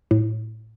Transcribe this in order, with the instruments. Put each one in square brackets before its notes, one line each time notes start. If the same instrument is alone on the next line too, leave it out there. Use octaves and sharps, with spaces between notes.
[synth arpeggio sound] A2